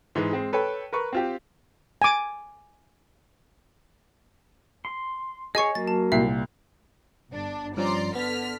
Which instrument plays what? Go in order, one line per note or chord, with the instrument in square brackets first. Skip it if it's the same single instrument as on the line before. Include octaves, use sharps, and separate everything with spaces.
[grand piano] G#2 E3 G#3
G#3 C4
A4 B4 C#5 G5
A#4 B4 C#6
C4 F4 G4
[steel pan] G#5 D6
[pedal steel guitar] C6
[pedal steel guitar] G#4 C#5 [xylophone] D#5 G#5 C#6
[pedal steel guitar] F#3 A#3 [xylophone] A6
[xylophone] A5
[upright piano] C2 A#2 C7 [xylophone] E5
[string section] G1 D4
[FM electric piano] G2 F3 C#4 [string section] D5 A#5 C6
[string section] D3 F6 B6 [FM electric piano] B3